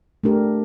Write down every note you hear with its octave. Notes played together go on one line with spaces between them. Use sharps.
A3 D4 G4 A#4